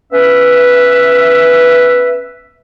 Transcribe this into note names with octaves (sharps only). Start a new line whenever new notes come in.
B3 C#4 B4 E5